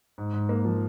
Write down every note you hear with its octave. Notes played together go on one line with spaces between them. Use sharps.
G#2
G#2
A#3
F3